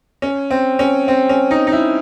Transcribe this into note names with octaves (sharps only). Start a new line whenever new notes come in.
C#4
C4
C#4
C4
C#4
D#4
D#4
E4